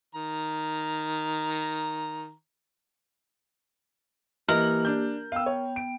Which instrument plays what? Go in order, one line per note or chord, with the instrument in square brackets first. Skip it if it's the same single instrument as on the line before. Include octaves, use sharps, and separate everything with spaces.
[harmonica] D#3 A#5
[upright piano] E3 D#5 F#7 [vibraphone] A#3 G4 [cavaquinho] A#4
[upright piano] D4 G6
[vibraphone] B3 G5 [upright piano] F5 E6
[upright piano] C#5
D7